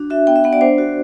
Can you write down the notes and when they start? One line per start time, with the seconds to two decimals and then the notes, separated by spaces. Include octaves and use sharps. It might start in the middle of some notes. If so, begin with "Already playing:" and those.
Already playing: D4 F#4
0.10 F#4 E5
0.27 B3 G5
0.36 E5
0.44 B3 F#5
0.53 D5
0.61 D4 C5
0.78 F#4